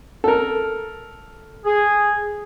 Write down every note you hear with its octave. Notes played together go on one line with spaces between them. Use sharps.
A4 A#4
G#4